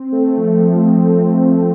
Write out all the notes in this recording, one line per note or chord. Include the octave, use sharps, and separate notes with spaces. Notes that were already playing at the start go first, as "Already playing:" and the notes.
Already playing: C4
A3
F3
F3
C4
A3
F3